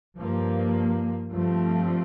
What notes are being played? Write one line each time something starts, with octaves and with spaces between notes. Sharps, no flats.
G2 F3 A#3
G2 F3 A3 C4